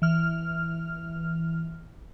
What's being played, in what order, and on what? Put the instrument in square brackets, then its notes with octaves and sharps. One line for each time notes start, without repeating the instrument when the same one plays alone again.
[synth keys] E3 F6